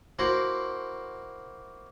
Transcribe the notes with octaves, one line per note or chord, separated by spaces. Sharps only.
A#3 E4 F#4 C5